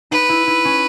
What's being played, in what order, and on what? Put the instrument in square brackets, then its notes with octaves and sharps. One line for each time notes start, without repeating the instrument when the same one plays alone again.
[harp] D#4 [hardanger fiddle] B4
[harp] E4
E4
C#4